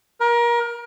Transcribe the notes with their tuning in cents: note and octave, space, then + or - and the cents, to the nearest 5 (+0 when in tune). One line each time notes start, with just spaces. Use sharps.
A#4 +30